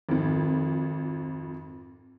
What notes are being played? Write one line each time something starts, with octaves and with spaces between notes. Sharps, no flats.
G#1 F2